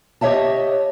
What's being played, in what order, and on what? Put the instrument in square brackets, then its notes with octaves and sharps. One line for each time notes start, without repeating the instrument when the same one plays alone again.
[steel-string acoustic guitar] G4 C#5 D#5 E5 A5